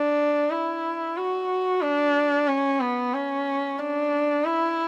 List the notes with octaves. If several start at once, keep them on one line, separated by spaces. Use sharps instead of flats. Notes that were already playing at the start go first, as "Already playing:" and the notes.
Already playing: D4
E4
F#4
D4
C#4
B3
C#4
D4
E4